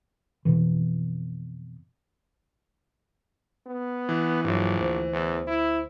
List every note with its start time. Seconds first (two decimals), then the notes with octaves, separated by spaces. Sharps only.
0.45 F2 B2 E3
3.66 B3
4.09 E3
4.44 A#1 G2 F#3
4.78 D2 C5
5.13 E2
5.47 E4